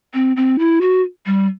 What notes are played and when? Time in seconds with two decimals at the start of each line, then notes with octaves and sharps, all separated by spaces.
0.14 C4
0.37 C4
0.59 E4
0.81 F#4
1.26 G3